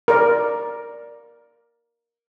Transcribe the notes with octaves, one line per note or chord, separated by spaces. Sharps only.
A#4 D5